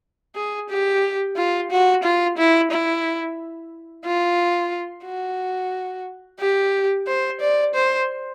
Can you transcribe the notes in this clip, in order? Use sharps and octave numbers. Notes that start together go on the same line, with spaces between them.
G#4
G4
F4
F#4
F4
E4
E4
F4
F#4
G4
C5
D5
C5